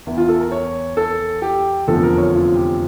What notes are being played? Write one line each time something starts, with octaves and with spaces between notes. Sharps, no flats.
E2 E3 E4
F4
A4
A#4
C#5
A4
G4
F1 E2 D3 F3 A4
A#4
C#5
F4
G4